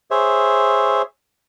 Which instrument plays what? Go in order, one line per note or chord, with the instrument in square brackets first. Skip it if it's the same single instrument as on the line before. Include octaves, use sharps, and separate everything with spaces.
[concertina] G#4 C5 C#5 E5